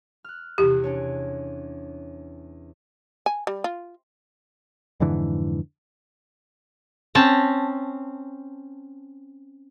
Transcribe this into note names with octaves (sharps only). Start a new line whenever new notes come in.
F6 F#6
E2 C3 G4
C#4 D4 C#5
G#5
G3
F4
F2 G#2 D3 E3
C4 C#4 A5